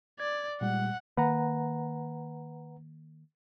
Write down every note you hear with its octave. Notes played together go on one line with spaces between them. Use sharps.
D5 G#6
A#2 G3 G#3 F#5
D#3 A#3 B4 F#5 A#5